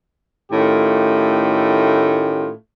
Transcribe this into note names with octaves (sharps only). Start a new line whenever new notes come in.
A2 D#3 A3 C#4 F4 G4